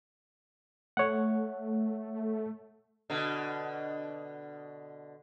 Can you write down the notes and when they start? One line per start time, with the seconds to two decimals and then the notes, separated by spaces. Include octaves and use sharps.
0.97 A3 C#5 F#5
3.10 B2 D3